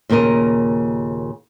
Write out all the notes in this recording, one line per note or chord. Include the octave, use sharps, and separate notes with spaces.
D#2 A#2 C#3 A#4 D#5